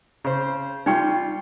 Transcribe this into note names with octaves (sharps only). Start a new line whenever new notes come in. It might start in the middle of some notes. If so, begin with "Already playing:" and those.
C#3 C5
G3 D#4 F4 G5 C#6